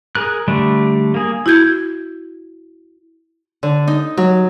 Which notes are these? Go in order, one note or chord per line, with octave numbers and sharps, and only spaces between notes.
G#4 A#4 F#6
D3 G3 A3 D4
A#3 G#4
E4 F#4 G6 G#6
D3
D#4
F#3